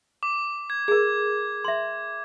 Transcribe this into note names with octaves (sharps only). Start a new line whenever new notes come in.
D6
G#6
G#4 A#4 G#6
E5 C6